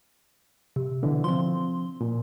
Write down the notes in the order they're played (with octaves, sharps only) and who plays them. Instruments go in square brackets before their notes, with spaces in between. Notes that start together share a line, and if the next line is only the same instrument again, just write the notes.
[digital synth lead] C3
[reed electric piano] B2 D3 E3
[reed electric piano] F3 C4 [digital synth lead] C6
[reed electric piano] A#2